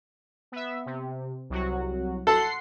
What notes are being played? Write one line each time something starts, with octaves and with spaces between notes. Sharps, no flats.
B3 E5
C3
C2 F#3 F#4
A4 F#5 C6 C7